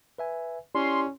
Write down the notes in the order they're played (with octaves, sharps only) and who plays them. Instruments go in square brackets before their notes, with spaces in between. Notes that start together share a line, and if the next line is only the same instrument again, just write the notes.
[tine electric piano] B4 E5 G#5
[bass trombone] C#4 [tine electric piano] E4 G4 D5 [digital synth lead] C6